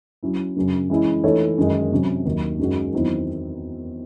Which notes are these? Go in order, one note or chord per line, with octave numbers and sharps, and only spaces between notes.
F#3 C#4 E4
F#2 C#3 F#3 C#4
E3 G#3 C#4 E4
E3 A3 D#4 A4 C#5
F#2 D#3 G#3 D#4
C3 F#3 C#4
D#2 D#3 F#3
F#2 D#3 G#3 C#4 F#4
E2 D#3 F#3 C4 E4